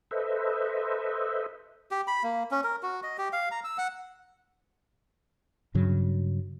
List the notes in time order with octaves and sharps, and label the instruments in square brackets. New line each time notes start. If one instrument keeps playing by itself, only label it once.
[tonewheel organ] A4 B4 C5 D#5 E5
[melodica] G4
B5
A#3
C#4
A#4
F#4
D#5
G4
F5
A#5
E6
F#5
[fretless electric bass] G2 C#3 F#3